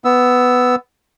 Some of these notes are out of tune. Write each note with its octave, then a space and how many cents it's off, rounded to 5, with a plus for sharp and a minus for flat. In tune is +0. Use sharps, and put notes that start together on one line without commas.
B3 +10 E6 +0